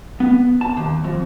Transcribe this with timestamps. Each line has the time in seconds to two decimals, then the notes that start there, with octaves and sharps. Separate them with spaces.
0.20 B3
0.61 A5
0.77 D#2
1.04 F2